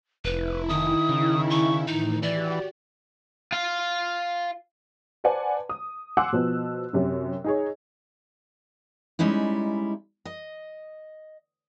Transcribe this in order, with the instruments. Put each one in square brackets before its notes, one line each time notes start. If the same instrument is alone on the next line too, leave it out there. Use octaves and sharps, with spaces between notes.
[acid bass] F1 [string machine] E4 [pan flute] B4
[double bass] D#3 [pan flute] D#6
[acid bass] C#3
[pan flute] C#6
[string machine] A2 E3 [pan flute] D#4
[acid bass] E3 [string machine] F#4 G4 [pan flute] D5
[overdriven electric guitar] F4 F5
[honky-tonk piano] B4 C5 D5 F#5 G#5 A5
D#6
F#5 G#5 C6 D6 E6 F#6
B2 F3 B3
F#2 C3 C#4
D#4 G#4 C#5
[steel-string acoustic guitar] G3 G#3 C#4 D#4 E4
D#5